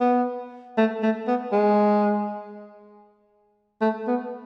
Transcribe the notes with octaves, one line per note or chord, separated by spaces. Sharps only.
B3
A3
A3
B3
G#3
A3
B3